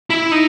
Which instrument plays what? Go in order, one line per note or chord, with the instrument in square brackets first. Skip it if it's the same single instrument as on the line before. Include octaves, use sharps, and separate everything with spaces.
[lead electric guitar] E4
D#4